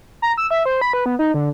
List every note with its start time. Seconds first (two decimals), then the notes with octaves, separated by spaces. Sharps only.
0.22 A#5
0.37 E6
0.51 E5
0.66 C5
0.81 B5
0.93 B4
1.06 B3
1.19 D#4
1.34 D3